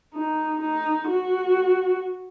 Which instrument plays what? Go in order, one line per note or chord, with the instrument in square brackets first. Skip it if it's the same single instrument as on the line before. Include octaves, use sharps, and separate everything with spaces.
[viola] D#4
D#4
F#4